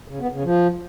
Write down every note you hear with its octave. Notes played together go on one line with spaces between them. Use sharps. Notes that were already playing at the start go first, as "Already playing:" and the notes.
C#3
B3
C#3
F3